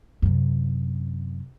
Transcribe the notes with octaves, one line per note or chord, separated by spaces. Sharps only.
F#2 C3